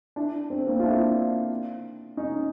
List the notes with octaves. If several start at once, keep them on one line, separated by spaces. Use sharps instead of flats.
D4 E4
C4 D4
A#3 C4
F4
D4 E4
C#4 D#4